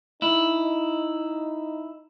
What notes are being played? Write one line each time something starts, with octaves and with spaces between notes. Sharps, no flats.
D#4 E4